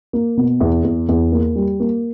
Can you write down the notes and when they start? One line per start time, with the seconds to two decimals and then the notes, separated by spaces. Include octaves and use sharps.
0.13 A#3
0.37 B2
0.60 E2
0.84 E2
1.09 E2
1.32 A#3
1.56 G3
1.80 A#3